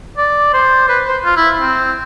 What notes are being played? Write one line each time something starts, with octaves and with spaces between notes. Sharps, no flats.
D5
C5
B4
C5
F4
E4
C4